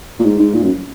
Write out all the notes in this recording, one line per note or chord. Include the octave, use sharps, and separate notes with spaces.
A#2
G#2
G#2
A#2
F#2